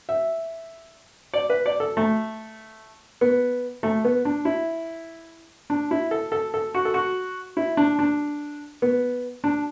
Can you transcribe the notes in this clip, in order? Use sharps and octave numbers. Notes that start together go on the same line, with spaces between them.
E5
D5
B4
D5
A4
A3
B3
A3
B3
D4
E4
D4
E4
A4
A4
A4
F#4
A4
F#4
E4
D4
D4
B3
D4